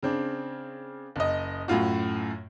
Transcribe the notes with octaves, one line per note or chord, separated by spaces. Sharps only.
C#3 C4 D4
F#1 D#5
F#2 A2 F4 F#4